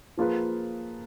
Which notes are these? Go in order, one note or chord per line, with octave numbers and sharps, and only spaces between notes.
F3 A#3 F4 G#4 B4